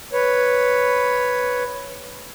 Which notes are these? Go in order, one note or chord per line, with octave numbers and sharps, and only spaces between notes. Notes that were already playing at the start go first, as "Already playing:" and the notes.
B4 C#5